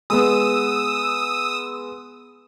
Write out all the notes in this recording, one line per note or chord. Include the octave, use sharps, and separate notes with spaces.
G#3 B3 D#6 E6